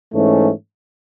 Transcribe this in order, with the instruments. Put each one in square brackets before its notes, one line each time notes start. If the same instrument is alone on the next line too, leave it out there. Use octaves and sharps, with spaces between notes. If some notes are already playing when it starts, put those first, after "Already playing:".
[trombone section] G#2 E3 A3 C#4